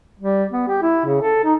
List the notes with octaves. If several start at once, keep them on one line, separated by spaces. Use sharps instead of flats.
G3
B3
G4
E4
C#3
A4
D#4